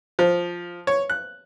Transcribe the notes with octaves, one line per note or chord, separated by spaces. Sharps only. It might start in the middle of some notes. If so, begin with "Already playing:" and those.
F3
C#5
F#6